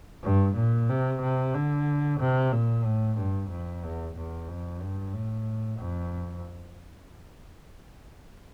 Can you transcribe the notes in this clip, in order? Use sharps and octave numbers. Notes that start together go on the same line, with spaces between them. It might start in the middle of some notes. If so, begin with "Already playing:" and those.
G2
A#2
C3
C3
D3
C3
A#2
A2
G2
F2
E2
E2
F2
G2
A2
F2